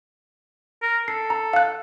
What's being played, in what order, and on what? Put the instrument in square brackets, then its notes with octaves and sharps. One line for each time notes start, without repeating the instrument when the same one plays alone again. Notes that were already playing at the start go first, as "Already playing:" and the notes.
[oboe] A#4
[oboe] A4 [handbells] C7
[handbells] A#5
F5 F#6